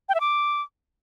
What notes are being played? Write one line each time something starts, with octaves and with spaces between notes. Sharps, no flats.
G5
E5
D6